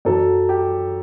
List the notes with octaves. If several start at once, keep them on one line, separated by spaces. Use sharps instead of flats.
F#2 F#3 A4
G4